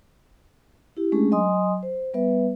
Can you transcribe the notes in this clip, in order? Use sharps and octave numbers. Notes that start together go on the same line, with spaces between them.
E4 G4
G#3 A3 C#4 D4 G#4
F#3 D#5 G#5 C6 D#6
C5
G3 B3 B4 E5